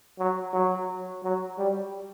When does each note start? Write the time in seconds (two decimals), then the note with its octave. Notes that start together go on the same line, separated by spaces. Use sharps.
0.19 F#3
0.53 F#3
1.23 F#3
1.58 G3